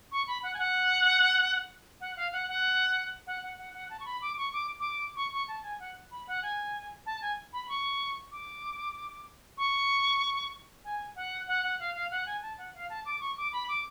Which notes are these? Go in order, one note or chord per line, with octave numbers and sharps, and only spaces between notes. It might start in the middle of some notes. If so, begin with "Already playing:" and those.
C#6
B5
F#5
G#5
F#5
F#5
F5
F#5
F#5
F#5
F#5
F#5
F#5
A5
C#6
B5
D6
C#6
D6
D6
C#6
C#6
A5
G#5
F#5
B5
F#5
G#5
A5
G#5
B5
B5
C#6
D6
C#6
G#5
F#5
F#5
F#5
F5
F5
F#5
G#5
A5
F#5
F5
A5
D6
C#6
D6
B5
D6